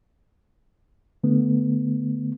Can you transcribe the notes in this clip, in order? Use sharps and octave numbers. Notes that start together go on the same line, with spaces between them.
D3 A3 B3